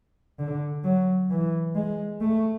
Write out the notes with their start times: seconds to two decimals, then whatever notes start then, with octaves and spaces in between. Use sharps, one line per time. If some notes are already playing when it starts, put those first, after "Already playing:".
0.39 D3
0.84 F#3
1.30 E3
1.76 G#3
2.21 A3